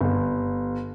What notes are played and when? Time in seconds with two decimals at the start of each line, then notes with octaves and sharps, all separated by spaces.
0.01 G1